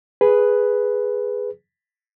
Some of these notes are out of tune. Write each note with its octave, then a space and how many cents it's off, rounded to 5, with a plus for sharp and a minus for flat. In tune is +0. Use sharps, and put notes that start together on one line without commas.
G#4 +0 B4 +0